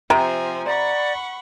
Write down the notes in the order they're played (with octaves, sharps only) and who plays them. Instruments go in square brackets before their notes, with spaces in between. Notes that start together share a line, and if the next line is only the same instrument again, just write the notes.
[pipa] C3 [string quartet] F3 C4 G#5 [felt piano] A#5
[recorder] D5 [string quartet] F#5 B5 C#6